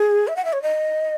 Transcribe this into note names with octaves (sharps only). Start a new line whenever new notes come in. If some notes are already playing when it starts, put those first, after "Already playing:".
Already playing: G#4
E5
F#5
E5
C#5
D#5